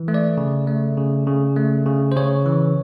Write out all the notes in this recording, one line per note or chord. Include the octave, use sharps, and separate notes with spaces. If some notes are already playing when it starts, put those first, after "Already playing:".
Already playing: E3
A3
D5
C#3
A3
C#3
C#3
A3
C#3
C5
C#3 C#5
E3